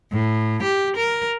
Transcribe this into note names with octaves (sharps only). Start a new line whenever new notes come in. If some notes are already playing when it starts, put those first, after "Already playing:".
A2
G4
A#4